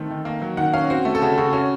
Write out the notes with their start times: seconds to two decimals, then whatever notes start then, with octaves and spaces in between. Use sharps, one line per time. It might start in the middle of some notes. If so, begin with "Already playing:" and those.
Already playing: D#3 A3 C4
0.10 D#3
0.25 A#3
0.42 F#3
0.57 D#3 F#5
0.73 C#4 F5
0.90 C4 F#4
1.05 A3
1.15 A4
1.22 C#3 F#4
1.38 C#3 F#4
1.53 C#4 F#4